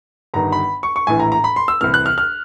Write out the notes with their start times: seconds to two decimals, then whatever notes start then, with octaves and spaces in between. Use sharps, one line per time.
0.34 G1 G2 D#3 A#5
0.52 B5
0.83 C#6
0.96 C#6
1.07 A#1 A2 E3 G#5
1.20 A#5
1.32 A#5
1.44 B5
1.56 C6
1.68 E6
1.81 C2 C3 E3 F6
1.94 F#6
2.06 F6
2.18 F6